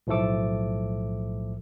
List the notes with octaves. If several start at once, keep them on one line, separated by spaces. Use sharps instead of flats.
B1 A2 F3 A3 A4 D6